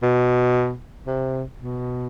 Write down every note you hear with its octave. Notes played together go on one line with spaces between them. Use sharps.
B2
C3
B2